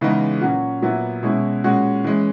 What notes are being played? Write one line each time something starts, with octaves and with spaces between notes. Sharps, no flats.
C#3 E3 G#3 B3 D#4
A#2 F#3 C#4 F#4
A#2 F#3 B3 E4
B2 G#3 C#4 E4
A#2 G#3 C#4 F#4
E3 G#3 C#4